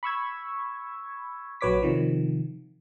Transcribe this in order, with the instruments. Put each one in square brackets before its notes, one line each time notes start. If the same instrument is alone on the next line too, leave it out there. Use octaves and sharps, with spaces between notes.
[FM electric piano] B5 C#6 E6 G#6
A#1 F#3 B4 C#5 D6 B6
C3 D#3 F3